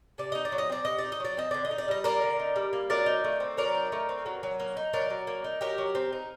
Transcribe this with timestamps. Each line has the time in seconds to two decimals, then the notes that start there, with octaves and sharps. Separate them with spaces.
0.18 C3 D5
0.32 D#4 D#5
0.45 D5
0.52 F#3
0.58 D#5
0.70 C4 D5
0.85 C3 D#5
0.98 D5
1.04 D#4
1.12 D#5
1.20 F#3 D5
1.37 C4 D#5
1.51 D3 D5
1.65 D#5
1.71 D#4
1.78 D5
1.88 G3 D#5
2.04 A#3 A#4 D5
2.22 D3
2.39 D#4
2.56 G3
2.73 A#3
2.90 F#3 A#4 D5
3.06 D#4
3.24 A3
3.40 C4
3.57 F#3 A#4 D5
3.75 D#4
3.92 A3
4.09 C4
4.26 F#3
4.43 F#3
4.60 A#3
4.77 D#4
4.93 F#3 A#4 D5
5.10 F#3
5.27 A#3
5.44 D#4
5.61 F#3 G4 A#4
5.78 F#3
5.95 C4
6.12 D#4